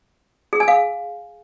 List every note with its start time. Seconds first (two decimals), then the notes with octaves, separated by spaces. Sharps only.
0.53 G#4
0.60 G#5
0.68 F5